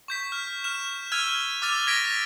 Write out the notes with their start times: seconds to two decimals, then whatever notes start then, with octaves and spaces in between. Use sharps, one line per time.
0.08 C#6 G6 B6
0.32 F6
0.64 F6 E7
1.12 E6 F6 G#6 D#7 F7
1.62 D6 E6 F6 A6 D#7 F7
1.87 G#6 A#6 B6 D7